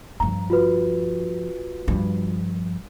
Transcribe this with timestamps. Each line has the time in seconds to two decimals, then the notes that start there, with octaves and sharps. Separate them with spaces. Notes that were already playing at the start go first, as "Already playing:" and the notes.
0.20 G2 F3 A#5
0.50 F4 F#4 B4
1.88 G2 F3